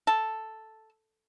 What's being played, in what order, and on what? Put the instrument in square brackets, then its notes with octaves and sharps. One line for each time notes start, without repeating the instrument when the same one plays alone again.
[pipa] A4